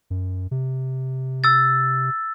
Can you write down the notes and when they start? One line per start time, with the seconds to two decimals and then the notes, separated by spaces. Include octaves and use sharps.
0.10 F#2
0.51 C3
1.44 E6 A6